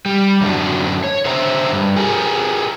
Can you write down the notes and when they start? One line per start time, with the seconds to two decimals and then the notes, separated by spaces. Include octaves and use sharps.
0.06 G3
0.41 F#2 D3 F#3 A3 D4
1.04 C#5
1.25 D3 C5 E5 A#5
1.72 G2
1.96 G4 G#4 A#4